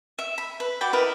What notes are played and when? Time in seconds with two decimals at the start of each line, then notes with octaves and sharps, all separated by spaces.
0.19 E5
0.38 B5
0.60 B4
0.81 F#4 D5 G5 B5
0.93 E4 A#4 B4 D#5